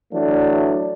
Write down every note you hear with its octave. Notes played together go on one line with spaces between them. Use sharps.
E3 F#3 A3 D4